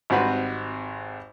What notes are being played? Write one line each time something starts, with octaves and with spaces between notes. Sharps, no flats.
G#1 G3 C4 F#4 B4 F#6